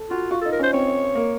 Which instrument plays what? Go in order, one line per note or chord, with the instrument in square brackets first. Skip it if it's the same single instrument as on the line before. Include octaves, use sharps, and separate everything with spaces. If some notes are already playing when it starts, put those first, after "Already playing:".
Already playing: [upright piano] A4
[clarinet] F4 [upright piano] F#4
[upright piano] F4 [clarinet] F#4
[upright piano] D#4 [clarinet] A4
[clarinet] A#4
[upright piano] C#4 [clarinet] C5
[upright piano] C4 [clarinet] C#5
[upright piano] A#3